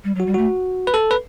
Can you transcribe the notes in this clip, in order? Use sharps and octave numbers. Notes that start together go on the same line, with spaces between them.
G3
F#3
F#4
G3
A3 F#4
B4
A4
B4